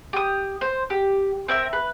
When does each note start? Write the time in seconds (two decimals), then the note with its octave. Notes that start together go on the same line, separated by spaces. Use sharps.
0.13 G4 D#6
0.61 C5
0.90 G4
1.48 C4 A#4 E5
1.73 B4